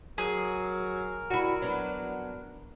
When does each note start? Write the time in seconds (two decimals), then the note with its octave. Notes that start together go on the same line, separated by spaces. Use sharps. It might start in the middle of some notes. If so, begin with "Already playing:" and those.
0.18 F#3 G#4 A#4
1.30 G3 E4 F#4
1.62 F#3 B3 D4